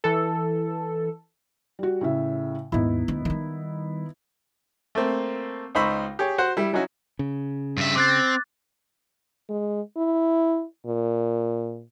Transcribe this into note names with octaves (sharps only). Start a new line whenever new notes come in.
E3 A4
G3 F#4
A2 C#3 E5
D#2 G#2 B3 D#4 E4
D2
D#3 G3
A3 A#3 C4
C#2 D#4 C5 B5 C#6 E6
G4 G#4 C#5
F#4 C5 F#5
G3 E4
F#3 C#4 D#4 E4 F#4
C#3
G2 E5
C4 D6 F#6 A6
G#3
E4
A#2